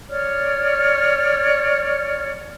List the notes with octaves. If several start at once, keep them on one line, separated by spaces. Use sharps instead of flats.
C#5 D5 F6